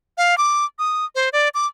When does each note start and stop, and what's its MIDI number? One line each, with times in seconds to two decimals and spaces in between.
0.18 0.37 77
0.38 0.65 86
0.79 1.05 87
1.15 1.29 72
1.33 1.49 74
1.54 1.67 86